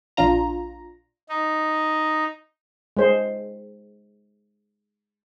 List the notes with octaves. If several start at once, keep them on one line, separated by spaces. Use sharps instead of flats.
A#1 D4 F4 A#5
D#4
G#3 C5